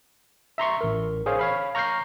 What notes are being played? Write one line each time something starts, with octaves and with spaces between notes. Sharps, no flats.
E5 A#5 C6 C#6
A1 A#4
G#4 C5 C#5 F5
C#5 F5 B5
A#5 C#6 F6 G6 A#6 C7